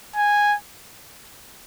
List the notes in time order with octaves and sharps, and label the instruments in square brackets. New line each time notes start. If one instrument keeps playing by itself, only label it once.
[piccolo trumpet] G#5